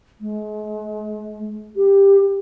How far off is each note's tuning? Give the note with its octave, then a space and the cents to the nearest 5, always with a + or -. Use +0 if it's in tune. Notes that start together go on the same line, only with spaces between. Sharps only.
G#3 +40
G4 +10